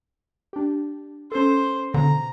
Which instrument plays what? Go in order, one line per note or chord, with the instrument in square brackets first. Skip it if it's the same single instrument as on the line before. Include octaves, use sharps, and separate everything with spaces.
[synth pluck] D4 G4
[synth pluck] C#4 A4 [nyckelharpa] C5
[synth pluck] B2 [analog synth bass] D3 [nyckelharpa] A#5